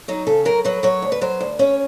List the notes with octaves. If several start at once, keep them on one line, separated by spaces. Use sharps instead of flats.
F#3 D#4
C#3 A4
F#3 A#4
F#3 B4
F#3 C#5
D2
B4
F#3 C5
D2
C#4 C#5